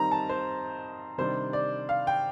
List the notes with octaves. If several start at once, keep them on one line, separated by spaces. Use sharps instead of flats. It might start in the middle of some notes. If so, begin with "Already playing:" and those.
Already playing: D#3 G3 C4 D#4 A#5
A5
C5
C3 D#3 G3 D4 C5
D5
F5
G5